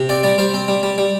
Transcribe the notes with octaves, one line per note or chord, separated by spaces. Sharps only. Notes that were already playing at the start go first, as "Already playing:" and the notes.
Already playing: C3
C4 D5
G3 D5
G3 C5
C4
G3
G3
G3